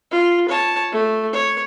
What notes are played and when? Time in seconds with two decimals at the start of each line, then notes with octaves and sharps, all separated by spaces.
0.11 F4
0.49 C#5 A5
0.92 A3
1.33 C#5